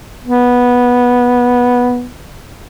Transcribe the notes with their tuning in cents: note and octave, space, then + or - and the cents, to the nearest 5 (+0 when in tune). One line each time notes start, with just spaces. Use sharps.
B3 -10